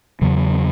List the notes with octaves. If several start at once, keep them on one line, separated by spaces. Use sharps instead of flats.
E2 C#3 F#3